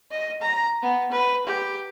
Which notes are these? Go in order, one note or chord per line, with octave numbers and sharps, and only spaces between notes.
D#5
A#5
B3
B4
G4